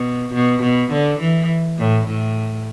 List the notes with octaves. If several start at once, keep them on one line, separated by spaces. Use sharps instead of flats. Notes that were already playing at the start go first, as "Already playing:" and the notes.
Already playing: B2
B2
B2
D3
E3
A2
A2